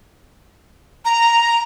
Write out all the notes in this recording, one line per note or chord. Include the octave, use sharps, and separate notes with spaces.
A#5